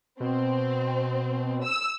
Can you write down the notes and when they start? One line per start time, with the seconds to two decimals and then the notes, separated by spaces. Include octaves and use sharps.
0.20 B2 C4
1.64 E6